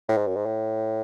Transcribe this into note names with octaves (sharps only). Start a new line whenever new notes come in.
A2
G#2
F#2
G#2
A2